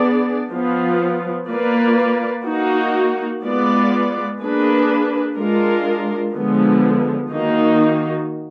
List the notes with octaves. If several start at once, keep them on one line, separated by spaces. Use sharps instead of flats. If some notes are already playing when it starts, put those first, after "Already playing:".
Already playing: B3 D4 G#4 D5
F3 B3 F4
A#3 F4 B4 D5
A#3 D#4 F#4
G#3 B3 F4 B4 D5
A#3 D4 G#4 B4
G#3 D4 F4 A#4
D3 F3 G#3 B3
D#3 A#3 D#4 F#4